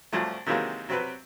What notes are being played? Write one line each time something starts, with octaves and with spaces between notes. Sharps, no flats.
C2 F3 F#3 A3
C3 D#3 E3 F#3 G#3 A#3
C3 F#3 C4 B4